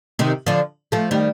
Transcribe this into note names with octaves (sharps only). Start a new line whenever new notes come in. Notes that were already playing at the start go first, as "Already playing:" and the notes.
C3 D#3
D3 F3
F3 A3
D#3 G3